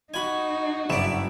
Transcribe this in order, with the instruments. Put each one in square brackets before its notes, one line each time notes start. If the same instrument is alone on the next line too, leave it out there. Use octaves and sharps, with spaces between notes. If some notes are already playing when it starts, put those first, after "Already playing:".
[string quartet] D#4 [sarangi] F#4 [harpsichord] G#5 B5
[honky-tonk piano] F#1 E5 E7 [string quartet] G2 [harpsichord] B4 D5